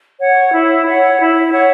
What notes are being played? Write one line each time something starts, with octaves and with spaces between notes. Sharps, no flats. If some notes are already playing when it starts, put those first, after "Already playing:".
C#5 F#5
E4
C#5 F#5
E4
C#5 F#5